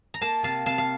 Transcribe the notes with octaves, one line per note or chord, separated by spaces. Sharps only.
A#5
A#3 F5 A5
C3 F5 A5
C3 F5 A5
F5